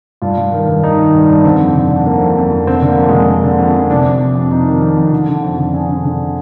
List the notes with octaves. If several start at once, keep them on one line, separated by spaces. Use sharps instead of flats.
G2 F4
G2
D#3
G2
D#3 D#4
D#3
G2
G2
D3 C4
F2
D3
D3
D3 A#3
F2
F2
F2
D3 C4
D3
A#3
F2
G#3
D3
D3 A#3
D3
F2
F2
C3 D4
F2
C3
F2
C3 D#4
D#3
F2
F2
D3
D3
F2
D3
D3 G#4
D3
D3